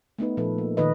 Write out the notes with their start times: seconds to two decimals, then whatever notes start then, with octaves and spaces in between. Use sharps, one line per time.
0.19 A3 B3 D#4 B4
0.37 A#2 F3 B3 A4 B4
0.58 A#3
0.77 A#2 D#3 B4 D#5